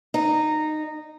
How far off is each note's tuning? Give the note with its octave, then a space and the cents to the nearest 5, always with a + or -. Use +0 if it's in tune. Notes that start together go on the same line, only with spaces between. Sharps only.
D#4 -15